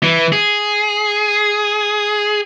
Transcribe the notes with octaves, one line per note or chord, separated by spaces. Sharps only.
E3
G#4